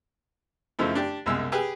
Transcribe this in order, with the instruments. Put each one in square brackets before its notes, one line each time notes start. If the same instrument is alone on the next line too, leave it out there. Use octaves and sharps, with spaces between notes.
[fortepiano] F#2 C#3 F3 A3 D#4 E4
D4 G4
C2 F#2 B2 G#3 E6
G4 G#4 B4